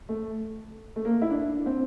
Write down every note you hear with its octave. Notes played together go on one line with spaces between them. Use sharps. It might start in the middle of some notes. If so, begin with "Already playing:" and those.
A3
A3
A#3
E4
D4
C4